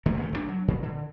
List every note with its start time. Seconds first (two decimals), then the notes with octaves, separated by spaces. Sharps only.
0.06 E1 D3 A3 A#3
0.17 D#2 C#3 A3
0.32 F#1 D2 B2 D4
0.49 F#3
0.68 A#2 C#3
0.83 D3